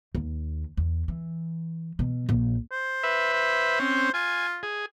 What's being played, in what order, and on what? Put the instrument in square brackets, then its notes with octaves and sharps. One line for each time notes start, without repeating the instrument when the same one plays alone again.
[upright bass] D#2
E2
E3
B2
A#1
[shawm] C5
[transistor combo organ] B4 E5
[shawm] C5
[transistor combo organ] C4 C#4
[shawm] F4 [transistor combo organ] G#5
[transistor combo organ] G#4